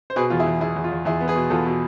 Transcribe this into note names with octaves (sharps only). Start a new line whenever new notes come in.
C5
B2 G#4 B4
E2 F4
E4 G#4
E2
E2 E4 G#4
E2
F4
E2
E2 E4 G#4
B3
G#4 B4
B2
E2 F4 A4
B2